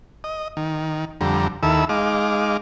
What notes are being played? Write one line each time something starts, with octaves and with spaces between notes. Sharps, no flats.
D#5
D#3
F2 D3 G3 A#5
D#2 D#3 E4 A4 B5 E6
G#3 D#4 F5 D6